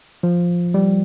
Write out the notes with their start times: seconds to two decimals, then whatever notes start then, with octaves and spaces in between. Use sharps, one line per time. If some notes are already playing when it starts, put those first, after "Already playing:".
0.23 F3
0.74 G3